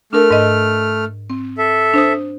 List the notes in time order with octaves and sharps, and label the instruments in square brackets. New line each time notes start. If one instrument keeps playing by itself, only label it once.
[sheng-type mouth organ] A3 F6 [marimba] D4 A#4
[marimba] G#2 D#5
C4
[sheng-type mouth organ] A4 E5
[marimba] D4 C5 D#6